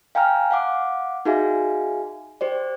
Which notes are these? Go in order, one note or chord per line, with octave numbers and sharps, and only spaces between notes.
F5 G5 G#5 A#5 F6
F5 F#5 D6
D#4 F#4 G#4 E5 F5 G#5
G4 C5 D5